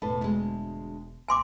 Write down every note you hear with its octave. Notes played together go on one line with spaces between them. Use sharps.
E1 A2 A4 B4
D2 G#3
G#1 C#4 G#5 C6 D6